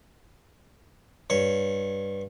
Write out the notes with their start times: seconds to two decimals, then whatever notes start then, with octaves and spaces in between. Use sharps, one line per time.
1.30 G2 C#5